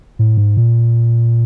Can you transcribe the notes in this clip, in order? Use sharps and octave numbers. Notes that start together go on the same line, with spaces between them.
A2
G#2
A#2